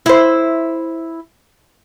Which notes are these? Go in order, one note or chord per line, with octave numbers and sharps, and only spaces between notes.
E4 C5